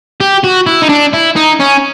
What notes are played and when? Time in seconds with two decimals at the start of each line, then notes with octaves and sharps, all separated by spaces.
0.20 G4
0.44 F#4
0.66 E4
0.82 D#4
0.89 D4
1.13 E4
1.36 D#4
1.60 C#4